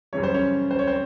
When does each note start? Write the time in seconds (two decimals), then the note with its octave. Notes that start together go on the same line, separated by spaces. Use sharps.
0.13 F#2 C#3 E3 G3 C#5
0.23 C5
0.34 C#4 C#5
0.71 C5
0.79 C#5
0.87 C4 C5